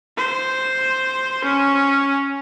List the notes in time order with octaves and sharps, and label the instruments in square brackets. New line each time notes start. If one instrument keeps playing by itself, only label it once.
[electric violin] C5
C#4